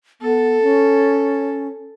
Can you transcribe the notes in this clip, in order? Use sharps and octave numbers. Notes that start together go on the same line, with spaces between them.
B3 A4
C#4